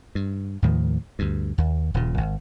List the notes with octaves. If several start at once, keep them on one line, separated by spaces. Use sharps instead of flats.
G2
D#2 A2 D#3 F3
D2 G2
D#2
D#1 A#2 C#3
G#1